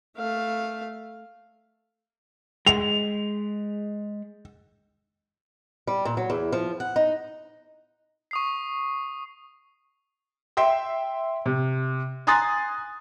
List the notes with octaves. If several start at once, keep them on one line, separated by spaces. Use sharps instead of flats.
A3 F5
G#3 F7
G3
A#2
F#3
E2
F3
F#5
D#4
C#6 D#6 C7
E5 G5 C6
C3
G#5 A#5 C6 D#6 F#6 A6